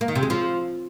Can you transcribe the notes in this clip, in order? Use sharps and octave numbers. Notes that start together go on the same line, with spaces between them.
A#3
D#3
C3
G#3
F3